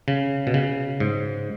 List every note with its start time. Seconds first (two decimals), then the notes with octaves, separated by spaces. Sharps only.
0.08 C#3
0.47 B2
0.54 C#3
1.00 G#2